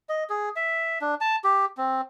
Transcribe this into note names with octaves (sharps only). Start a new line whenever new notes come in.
D#5
G#4
E5
D4
A5
G4
C4